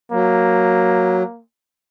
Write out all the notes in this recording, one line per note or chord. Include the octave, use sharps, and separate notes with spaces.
F#3 A#3